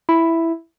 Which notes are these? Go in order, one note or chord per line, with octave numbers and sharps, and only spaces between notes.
E4